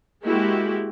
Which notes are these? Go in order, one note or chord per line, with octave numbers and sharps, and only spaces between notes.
G#3 A#3 E4 F#4 G4